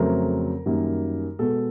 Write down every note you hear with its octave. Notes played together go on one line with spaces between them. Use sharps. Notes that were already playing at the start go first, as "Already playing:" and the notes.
Already playing: F2 C#3 F#3 A3 C4 A#4
F#2 D#3 G3 A#3
B2 G#3 B3 A4